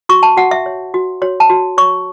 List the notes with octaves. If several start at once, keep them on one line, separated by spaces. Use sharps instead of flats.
F#4 C#6
A5
F#4 F#5
E5
C#5
F#4
F#4 C#5
A5
F#4
C#5 C#6